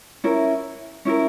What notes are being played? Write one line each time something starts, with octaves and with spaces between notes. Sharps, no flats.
C#4 E4 A#4
C#4 E4 A#4